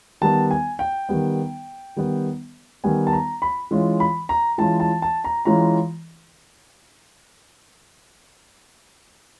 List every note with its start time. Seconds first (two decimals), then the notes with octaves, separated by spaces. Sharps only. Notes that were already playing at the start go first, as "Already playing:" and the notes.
0.21 D#3 G3 B3 A5
0.51 G#5
0.79 G5
1.09 D#3 G3 B3
1.96 D#3 G3 B3
2.84 D#3 G3 B3 G#5
3.07 A5
3.13 A#5
3.42 B5
3.71 E3 G#3 C#4 F4
4.00 B5
4.29 A#5
4.58 E3 G#3 C#4 F4 A5
4.80 A5
5.02 A5
5.24 A#5
5.45 E3 G#3 C#4 F4 A#5